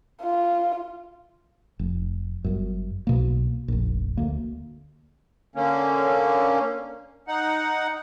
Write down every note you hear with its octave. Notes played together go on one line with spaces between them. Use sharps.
F4
F1
G1 F#2
B1 B2 A#3
F1 A#1
D2 A#3
D3 A#3 C#4
D#4 F#5